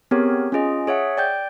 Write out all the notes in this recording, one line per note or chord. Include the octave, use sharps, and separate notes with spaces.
B3 C4 G4 G#4 A#4 C#5
C#4 F4 G#4 D#5
G#4 C#5 E5 F#5
D5 G5 G6